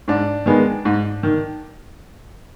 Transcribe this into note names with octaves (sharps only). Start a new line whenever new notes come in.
G#2 D4
D#3 G#3 B3
G#2
D#3